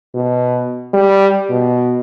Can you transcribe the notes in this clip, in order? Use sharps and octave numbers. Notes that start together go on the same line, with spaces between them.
B2
G3
B2